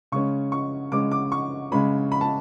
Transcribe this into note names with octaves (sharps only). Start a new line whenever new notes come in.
C#3 G#3 C#4 C#6
C#6
C#3 G#3 C#4 D6
D6
C#6
C#3 G#3 C#4 B5
B5
A5